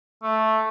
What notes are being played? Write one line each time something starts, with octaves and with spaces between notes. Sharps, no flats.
A3